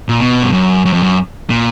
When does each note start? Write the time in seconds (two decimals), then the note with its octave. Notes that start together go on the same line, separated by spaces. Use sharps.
0.09 A#2
0.20 B2
0.43 G2
0.52 F#2
0.85 F#2
0.93 F2
1.03 F#2
1.50 A#2